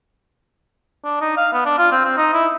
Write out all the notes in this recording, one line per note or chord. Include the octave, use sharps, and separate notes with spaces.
D4
D#4
F5
B3
D4
F4
C4
C4
D#4
E4